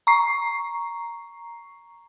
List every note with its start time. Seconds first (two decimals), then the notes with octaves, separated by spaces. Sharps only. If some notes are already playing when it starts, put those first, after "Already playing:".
0.07 A#5 C#6 C7